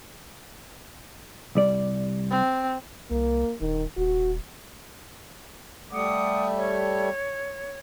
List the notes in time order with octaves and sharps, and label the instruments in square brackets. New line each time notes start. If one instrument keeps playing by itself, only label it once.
[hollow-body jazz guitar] C2 G3 D5
[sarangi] C4
[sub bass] C2 [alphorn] A#3
[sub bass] D#1 [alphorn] D#3
[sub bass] D#1 [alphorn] F#4
[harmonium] G3 A3 [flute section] F#5 D6 D#6
[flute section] C#5